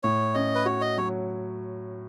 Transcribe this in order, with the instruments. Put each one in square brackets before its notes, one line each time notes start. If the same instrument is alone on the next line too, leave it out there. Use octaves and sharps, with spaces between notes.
[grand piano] A2 [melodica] C#5
[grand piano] C#4 [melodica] D#5
[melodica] B4
[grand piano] F#4 [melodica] C#5
[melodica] D#5
[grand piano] F#3 [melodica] C#5